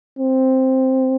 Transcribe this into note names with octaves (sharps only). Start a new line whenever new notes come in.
C4